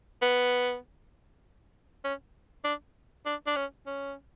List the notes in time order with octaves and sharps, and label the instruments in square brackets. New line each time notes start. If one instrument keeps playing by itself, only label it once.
[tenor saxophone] B3
C#4
D4
D4
D4
C#4
C#4